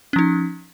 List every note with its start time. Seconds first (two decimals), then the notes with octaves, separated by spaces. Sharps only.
0.13 C#4
0.16 F3
0.19 D#4